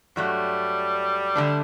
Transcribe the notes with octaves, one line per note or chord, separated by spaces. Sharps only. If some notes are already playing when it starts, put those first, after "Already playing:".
G2 F#3 G3 A3
D3 A3 D4